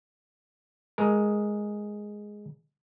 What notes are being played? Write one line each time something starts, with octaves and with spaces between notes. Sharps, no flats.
G#3 A#4